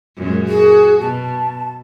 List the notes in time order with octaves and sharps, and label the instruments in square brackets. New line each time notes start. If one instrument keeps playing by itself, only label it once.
[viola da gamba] F#2 A#2 G#3
[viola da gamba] F#4 [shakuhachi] G#4
[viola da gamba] B2 [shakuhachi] A5